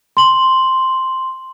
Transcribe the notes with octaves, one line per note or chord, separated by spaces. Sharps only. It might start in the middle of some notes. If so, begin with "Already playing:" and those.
C6 F#7